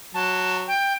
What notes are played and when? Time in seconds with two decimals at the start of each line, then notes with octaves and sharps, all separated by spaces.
0.14 F#3 A5
0.67 G5